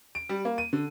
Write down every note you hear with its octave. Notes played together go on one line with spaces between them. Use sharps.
D7
G3
A#3
D#7
D3